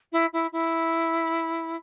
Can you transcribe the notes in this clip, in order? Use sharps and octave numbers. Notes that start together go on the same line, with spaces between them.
E4
E4
E4